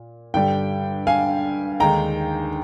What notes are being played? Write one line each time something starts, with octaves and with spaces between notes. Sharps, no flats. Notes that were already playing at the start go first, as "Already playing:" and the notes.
Already playing: A#2
G2 D3 G3 G5
F5 G#5
D#2 D3 G#3 D#4 G5 A#5